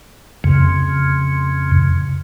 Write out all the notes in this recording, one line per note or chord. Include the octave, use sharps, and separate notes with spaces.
F2 C#3